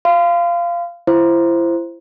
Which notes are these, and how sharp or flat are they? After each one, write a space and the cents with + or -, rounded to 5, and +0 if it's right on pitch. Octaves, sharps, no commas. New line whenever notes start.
F5 -15 C6 -40
E4 +35 C5 +0